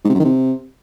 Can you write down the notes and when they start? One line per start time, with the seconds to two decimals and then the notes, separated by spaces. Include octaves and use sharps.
0.04 G#2
0.10 C3
0.15 F#2
0.20 D#3
0.25 C3